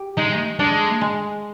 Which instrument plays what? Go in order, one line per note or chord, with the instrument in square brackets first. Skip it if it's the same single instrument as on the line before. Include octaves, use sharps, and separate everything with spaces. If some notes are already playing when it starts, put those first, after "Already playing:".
Already playing: [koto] G4
[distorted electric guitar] G#3 [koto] D#4
[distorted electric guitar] G#3 [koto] D4
[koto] G#3